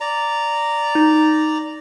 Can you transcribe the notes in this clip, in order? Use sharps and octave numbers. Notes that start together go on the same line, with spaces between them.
D5 A#5
D#4